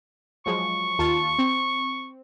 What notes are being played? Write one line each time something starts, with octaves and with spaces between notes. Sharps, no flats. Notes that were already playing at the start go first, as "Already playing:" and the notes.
F3 F#3 G#3 C#6
D#2 F4 A5
C4